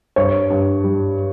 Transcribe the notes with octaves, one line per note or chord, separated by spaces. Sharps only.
G2 C#5
G2
G3